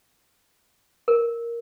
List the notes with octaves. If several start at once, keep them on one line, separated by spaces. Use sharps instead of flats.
A#4